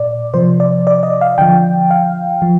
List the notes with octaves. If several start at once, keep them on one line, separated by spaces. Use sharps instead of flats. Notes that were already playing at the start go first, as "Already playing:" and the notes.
Already playing: A#2 D5
C3 F3 C5
D5
D5
D#5
F5
D3 F3 G5
F5
F3